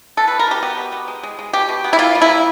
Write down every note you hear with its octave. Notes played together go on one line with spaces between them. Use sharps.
B3 A4
B2 B4
A#4
B2 G4
B3 G4
B2
B3
G#3
G#3
G#3
B2 G4
B2
B3
E4
A#3 F4
G3
E4
A#3